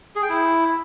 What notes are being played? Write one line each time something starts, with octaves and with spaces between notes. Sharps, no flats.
G#4
G5
E4